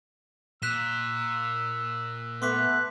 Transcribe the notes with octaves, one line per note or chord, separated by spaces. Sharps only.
A#2 E6 F#6 B6 E7
A3 B3 C6 D6 F#6 B6